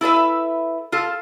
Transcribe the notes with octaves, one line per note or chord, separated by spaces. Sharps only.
E4 A4 B4 E5
F4 A4